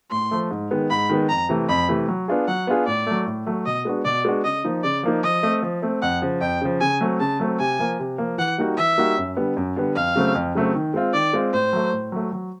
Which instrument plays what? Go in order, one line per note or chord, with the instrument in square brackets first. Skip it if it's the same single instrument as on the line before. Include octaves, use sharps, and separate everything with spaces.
[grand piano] A2 [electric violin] C6
[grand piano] F3 A3
G#2
D#3 G#3 B3
[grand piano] G#2 [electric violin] B5
[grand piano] D#3 G#3 B3
[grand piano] F2 [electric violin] A#5
[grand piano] C3 E3 A3
[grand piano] F2 [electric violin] B5
[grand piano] C3 E3 A3
F#3
B3 D4 F4 G#4
[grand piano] F#3 [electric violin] F#5
[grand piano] B3 D4 F4 G#4
[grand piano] A2 [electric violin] D5
[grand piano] F#3 A3
A2
F#3 A3
[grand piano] B2 [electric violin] D#5
[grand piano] G#3 B3 D4 F#4
[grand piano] B2 [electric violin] D5
[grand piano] G#3 B3 D4 F#4
[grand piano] C#3 [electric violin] D#5
[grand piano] F3 A#3 D#4
[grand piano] C#3 [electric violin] D5
[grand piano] F3 A#3 D#4
[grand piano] F3 [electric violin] D#5
[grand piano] A3 C4
F3
A3 C4
[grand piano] F2 [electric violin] F#5
[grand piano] C#3 F3
[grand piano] F2 [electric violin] G5
[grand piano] C#3 F3
[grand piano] C#3 [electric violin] G#5
[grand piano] F#3 A3 C4
[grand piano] C#3 [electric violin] A5
[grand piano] F#3 A3 C4
[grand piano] C3 [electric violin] G#5
[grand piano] F3 A#3
C3
F3 A#3
[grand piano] E3 [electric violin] F#5
[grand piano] G3 A#3 D#4 F#4
[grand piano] E3 [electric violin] E5
[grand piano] G3 A#3 D#4 F#4
F#2
D3 G3 B3
F#2
D3 G3 B3
[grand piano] F2 [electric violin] F5
[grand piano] C#3 F#3 A3 C4
F2
C#3 F#3 A3 C4
D#3
G#3 C4 F4
[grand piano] D#3 [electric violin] D5
[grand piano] G#3 C4 F4
[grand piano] A2 [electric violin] C5
[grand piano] F#3 A3
A2
F#3 A3
F#3